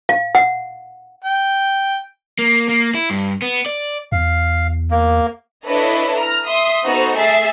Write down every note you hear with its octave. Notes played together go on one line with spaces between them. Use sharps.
F5
F#5
G5
A#3
A#3
E4
G2
B3
D5
E2 F5
A#3
D4 E4 A4 B4 C#5 D#5
A#5 F6
E5 C6 D#6
B3 D#4 F#4 A4 C5
A3 G#4 A4 E5 A6 C7